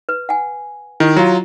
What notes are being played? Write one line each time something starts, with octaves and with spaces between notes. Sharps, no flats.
B4
F#5 G#5
D#3 E4 G4 D#5
F#3 F4 G4 A#5